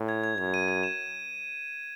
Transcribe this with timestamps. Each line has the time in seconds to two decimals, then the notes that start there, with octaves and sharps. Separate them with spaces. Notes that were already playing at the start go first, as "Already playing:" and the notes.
Already playing: A2
0.09 G#6
0.24 G#6
0.38 F#2 G#6
0.54 D#7
0.68 G#6
0.83 E7